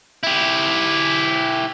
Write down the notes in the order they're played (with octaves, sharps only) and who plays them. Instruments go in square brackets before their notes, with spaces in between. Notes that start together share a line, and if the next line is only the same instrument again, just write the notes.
[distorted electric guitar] E4 G4